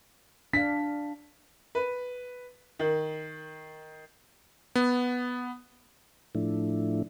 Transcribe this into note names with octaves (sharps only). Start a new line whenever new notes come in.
D4 F5 B6
B4
D#3
B3
A2 F3 A3 D4 E4